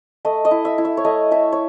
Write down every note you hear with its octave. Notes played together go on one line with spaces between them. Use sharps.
A3 D#5
D#5
E4
E5
E4
E5
C#5
A3 D#5
A3 E5
C#5